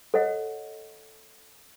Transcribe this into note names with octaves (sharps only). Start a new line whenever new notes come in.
A4 C#5 D#5 F#5